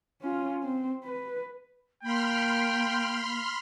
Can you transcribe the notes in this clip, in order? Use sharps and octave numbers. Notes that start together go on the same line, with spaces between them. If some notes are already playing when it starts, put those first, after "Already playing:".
C#4 F4
C4
B4
A#3 G5 B5 C6 F6